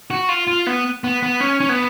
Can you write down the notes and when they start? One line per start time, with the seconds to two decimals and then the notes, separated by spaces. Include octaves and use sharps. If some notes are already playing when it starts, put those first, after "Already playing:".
0.10 F#4
0.29 F4
0.47 F4
0.67 B3
1.04 B3
1.23 B3
1.40 C#4
1.60 C#4
1.69 B3